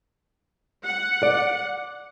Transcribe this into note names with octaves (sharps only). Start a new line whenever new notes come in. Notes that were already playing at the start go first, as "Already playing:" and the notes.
F#5
D5